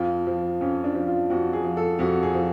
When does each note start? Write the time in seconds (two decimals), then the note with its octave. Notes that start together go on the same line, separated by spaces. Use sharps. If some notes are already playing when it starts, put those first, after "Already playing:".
Already playing: F2 F4
0.27 F3
0.61 F2 C#4
0.84 D4
0.95 F3
1.07 F4
1.30 F2 F#4
1.53 G#4
1.64 F3
1.77 A4
1.99 F2 F#4
2.23 G#4
2.34 F3